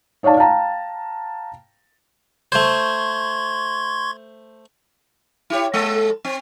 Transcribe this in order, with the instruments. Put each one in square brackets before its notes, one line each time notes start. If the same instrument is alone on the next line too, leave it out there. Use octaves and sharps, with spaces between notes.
[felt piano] D#4 C#5 D5 F5 A5
F5 G5 A5 A#5
[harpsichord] A3 C5 [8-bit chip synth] C6 C#6 G#6
[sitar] E4 G4 C#5
G#3 A4
C4